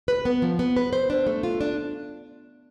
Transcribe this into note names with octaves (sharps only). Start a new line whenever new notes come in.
B4
B3
F3
B3
B4
C5
D4
A3
F4
D4